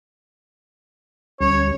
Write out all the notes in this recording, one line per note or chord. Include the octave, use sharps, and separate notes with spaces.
D2 G3 C#4 C#5